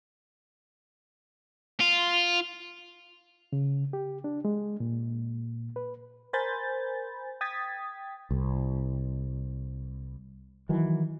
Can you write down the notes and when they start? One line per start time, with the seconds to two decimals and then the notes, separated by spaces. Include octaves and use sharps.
1.80 F4
3.53 C#3
3.93 G4
4.24 D4
4.45 G#3
4.80 A#2
5.76 B4
6.33 A#4 C5 G#5 B5 G6 A6
7.41 G5 D#6 G#6 A6 B6
8.31 C2
10.69 D#3 E3 F#3